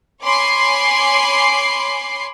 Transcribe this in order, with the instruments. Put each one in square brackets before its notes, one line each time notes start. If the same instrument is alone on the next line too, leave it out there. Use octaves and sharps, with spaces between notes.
[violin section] C#5 G#5 B5 C6 D6 C7